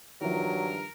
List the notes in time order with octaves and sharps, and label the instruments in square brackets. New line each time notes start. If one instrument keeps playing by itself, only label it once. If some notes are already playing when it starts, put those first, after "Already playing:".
[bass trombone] G2 [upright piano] D#3 F3 E5 [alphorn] F#3 [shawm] A#4